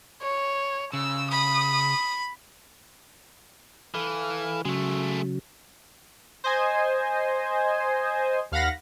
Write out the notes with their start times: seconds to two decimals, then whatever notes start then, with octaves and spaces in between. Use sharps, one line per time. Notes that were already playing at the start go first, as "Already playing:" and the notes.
0.22 C#5
0.93 C#3 E6
1.31 B5 D#6
3.94 E3 A4 F5
4.65 C#3 F#3 G#3 A3
6.44 C5 D#5 G#5
8.52 D#2 F5 F#5 B5 A#6